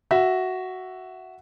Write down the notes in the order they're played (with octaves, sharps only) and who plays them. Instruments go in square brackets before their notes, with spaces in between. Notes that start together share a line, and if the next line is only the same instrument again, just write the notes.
[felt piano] F#4 E5